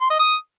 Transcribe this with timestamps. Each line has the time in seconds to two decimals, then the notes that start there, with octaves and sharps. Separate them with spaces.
0.01 C6
0.10 D#5
0.19 D#6